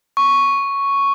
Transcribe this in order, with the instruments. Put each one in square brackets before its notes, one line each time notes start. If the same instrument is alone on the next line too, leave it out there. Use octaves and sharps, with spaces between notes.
[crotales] C#6